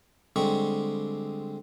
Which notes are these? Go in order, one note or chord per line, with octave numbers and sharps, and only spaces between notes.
D3 G3 G#3 C4 C#6